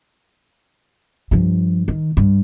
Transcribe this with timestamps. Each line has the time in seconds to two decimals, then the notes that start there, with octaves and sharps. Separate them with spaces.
1.31 G2 F3
1.88 D#3
2.17 G2